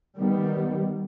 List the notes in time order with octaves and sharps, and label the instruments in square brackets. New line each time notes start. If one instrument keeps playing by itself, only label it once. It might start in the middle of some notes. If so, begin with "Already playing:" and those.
[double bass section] D#3 G3 B3